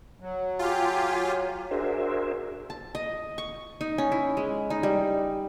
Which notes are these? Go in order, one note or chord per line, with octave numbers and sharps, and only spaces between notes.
F#3
F4 G4 G#4 G#5
D4 F#4 G#4 A#4 C5 E5
A5
D#5
C#6
D#4
C#4
E4
G#3
D#4
G3